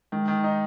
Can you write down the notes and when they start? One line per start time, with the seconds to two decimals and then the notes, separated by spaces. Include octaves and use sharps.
0.12 D#3 G#3
0.28 D#3
0.44 D#4